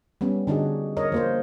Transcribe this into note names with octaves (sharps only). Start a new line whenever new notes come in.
G3 B3 C#4
D3 D4 D#4 F#4 G#4
A#4 C#5 D#5
F3 A#3 C5